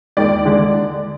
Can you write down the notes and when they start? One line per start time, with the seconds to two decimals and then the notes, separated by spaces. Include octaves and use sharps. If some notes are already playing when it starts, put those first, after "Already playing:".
0.17 D#2 D#3 G#3 D5
0.45 D3 G#3